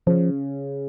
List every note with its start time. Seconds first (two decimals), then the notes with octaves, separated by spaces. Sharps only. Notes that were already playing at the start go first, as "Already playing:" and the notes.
0.06 C#3 F3